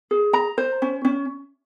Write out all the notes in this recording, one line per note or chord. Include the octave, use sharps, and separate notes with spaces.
G#4
A#5
C5
C#4
C#4